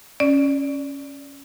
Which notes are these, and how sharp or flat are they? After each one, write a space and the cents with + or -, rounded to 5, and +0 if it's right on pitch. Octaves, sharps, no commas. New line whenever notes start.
C#4 +0 D5 +0